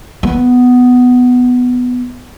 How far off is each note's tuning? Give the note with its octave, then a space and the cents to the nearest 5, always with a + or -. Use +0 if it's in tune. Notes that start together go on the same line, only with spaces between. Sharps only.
B3 +10